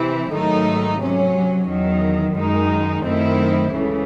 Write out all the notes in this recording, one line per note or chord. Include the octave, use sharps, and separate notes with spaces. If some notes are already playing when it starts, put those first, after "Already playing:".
Already playing: C3 E3 C4 E4
G#2 D#3 F#3 A3 D#4
C3 F#3 C#4
E2 D#3 F#3
F#2 D#3 G#3 D#4
F#2 D#3 A3 C4 E4
C#2 C#3 E3 A3